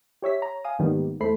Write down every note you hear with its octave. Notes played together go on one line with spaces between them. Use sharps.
G4 C#5 E5 B6
C#5 A#5
F5 G#5 D#6
G#2 D#3 G3 A#3 B3
E2 A3 A4 C5 B5 C7